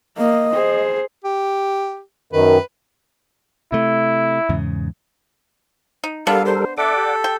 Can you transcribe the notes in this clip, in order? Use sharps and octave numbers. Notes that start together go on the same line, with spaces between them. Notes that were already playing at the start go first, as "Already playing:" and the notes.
A#3 D#5
G#4 C5
G4
F#2 D#3 B4
C3 A3 E4
E2 G#2 C#3
D#4
G3 B3 D4 A4 A#4 F5
C5
A4 D5 E5 F#5 D6
G4
G5